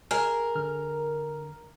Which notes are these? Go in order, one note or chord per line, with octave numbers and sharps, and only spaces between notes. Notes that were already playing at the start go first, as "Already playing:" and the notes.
G#4 A#4
D3 F6